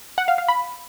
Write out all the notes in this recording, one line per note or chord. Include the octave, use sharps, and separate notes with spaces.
F#5
F5
F5
B5